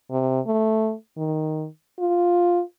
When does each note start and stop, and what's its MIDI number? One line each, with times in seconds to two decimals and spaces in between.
0.11 0.40 48
0.47 0.94 57
1.17 1.67 51
2.00 2.62 65